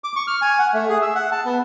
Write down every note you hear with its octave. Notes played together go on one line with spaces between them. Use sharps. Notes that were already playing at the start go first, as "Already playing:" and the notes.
D6
C#6
F6
G#5
F#5
A3
G#4
E5
F#5
A5
B3